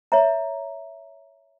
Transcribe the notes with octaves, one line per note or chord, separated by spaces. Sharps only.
C#5 E5 A#5